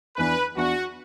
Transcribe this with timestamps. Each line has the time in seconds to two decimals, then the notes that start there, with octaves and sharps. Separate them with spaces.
0.16 E2 E3 D4 B4
0.56 E2 E3 D4 F#4